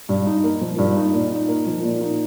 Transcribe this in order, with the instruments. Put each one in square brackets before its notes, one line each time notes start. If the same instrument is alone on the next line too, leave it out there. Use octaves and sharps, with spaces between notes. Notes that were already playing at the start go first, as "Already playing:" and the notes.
[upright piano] G2
D#4
A#3
F3
G2
D#4
A#2
D#4
A#3
F3
A#2
D#4